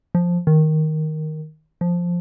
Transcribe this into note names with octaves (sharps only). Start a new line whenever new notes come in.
F3
D#3
F3